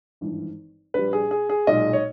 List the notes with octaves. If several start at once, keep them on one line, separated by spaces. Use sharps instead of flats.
G#1 G2 E3
A#1 A#2 G3 B4
G#4
G#4
G#4
B1 A#2 G#3 D#5
C#5